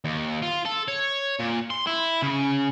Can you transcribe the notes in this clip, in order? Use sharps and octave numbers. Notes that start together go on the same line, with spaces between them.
D#2
F4
A4
C#5
A#2
C6
E4
C#3